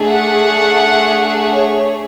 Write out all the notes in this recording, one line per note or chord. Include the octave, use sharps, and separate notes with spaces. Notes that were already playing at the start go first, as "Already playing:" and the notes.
Already playing: A3 D4 G#4
F#5
C#5